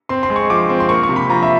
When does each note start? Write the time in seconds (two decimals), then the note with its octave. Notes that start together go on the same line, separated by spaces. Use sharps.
0.09 C4 C6
0.23 C6
0.30 G#3
0.36 C#6
0.50 F3 D6
0.69 C4
0.80 C6
0.89 A#3 C#6
1.03 C#6
1.09 C3
1.16 B5
1.29 F3 A#5
1.43 E5